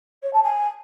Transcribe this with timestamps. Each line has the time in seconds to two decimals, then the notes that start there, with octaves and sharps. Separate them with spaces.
0.22 C#5
0.33 A5
0.43 G#5